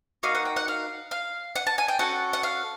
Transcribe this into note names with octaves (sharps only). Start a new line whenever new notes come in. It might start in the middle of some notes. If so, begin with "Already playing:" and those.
A#3 D#4 F#4 F5
F#5
G5
F#5
F5
F5
F#5
A5
G#5
G5
C#4 F#4 A4 F#5
F#5
F5